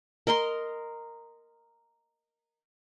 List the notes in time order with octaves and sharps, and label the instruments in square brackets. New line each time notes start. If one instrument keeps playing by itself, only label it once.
[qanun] A#4 D#5 A#5 C6